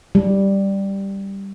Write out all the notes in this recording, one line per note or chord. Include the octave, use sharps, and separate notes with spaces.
G3